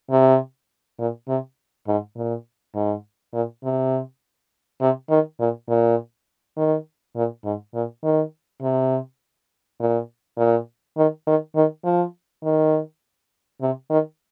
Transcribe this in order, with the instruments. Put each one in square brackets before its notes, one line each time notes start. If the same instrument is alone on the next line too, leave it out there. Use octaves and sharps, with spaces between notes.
[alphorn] C3
A#2
C3
G#2
A#2
G#2
A#2
C3
C3
D#3
A#2
A#2
D#3
A#2
G#2
A#2
D#3
C3
A#2
A#2
D#3
D#3
D#3
F3
D#3
C3
D#3